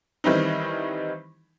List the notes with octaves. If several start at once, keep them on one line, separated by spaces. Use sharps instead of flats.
D#3 E3 G3 C4 D#4